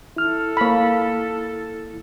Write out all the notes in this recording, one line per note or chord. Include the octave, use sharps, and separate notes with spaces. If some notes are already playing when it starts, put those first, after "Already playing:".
E4 A4 F6
A#3 B5